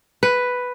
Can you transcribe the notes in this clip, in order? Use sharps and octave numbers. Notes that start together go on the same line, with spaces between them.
B4